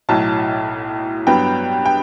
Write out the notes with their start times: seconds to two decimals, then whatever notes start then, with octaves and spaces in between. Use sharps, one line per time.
0.09 B1 A2 F#3 A5
1.26 G2 F#3 B3 G5
1.85 G5